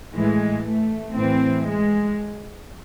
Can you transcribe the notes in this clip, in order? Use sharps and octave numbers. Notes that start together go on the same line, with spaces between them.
A2 E3 G#3
A3
A2 E3 C4
G#3